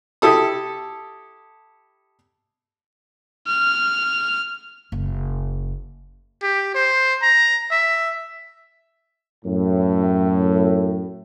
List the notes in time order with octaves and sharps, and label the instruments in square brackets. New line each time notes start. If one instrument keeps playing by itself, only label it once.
[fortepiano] E4 G4 A4 D#6
[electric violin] F6
[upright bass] F#1
[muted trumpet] G4
C5
A#5
E5
[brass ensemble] F#2 A2